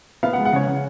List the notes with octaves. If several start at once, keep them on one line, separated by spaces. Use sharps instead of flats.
B3 F5
F#5
G#3
F#5
C#3 C#5
C#3